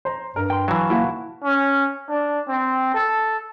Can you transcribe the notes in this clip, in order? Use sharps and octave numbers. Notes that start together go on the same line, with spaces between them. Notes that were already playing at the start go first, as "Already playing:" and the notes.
C5 A#5
G2 A#4
G5 C6
E3 F#3 F5 A5 C#6
A#3 E4 F#4
C#4
D4
C4
A4